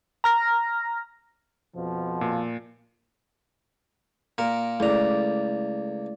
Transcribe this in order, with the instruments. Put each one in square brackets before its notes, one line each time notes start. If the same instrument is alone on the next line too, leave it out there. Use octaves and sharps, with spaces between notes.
[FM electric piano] A#5 F6 A#6
[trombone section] F2 B2 F3
[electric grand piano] A#2
[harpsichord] A#2 A#4
[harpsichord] C#2 A#5 [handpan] A3 E4 D5